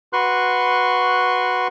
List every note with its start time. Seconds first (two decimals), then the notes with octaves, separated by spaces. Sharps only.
0.13 F#4 B4 C6 C#6 F#6